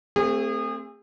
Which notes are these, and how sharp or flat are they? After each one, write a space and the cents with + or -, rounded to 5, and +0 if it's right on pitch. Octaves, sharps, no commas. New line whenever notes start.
A3 +30 C4 +0 G#4 -30